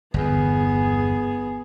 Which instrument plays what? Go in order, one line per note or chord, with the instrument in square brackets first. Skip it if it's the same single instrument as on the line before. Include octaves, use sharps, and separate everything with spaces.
[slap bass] G1 E2 [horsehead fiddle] B3 G#4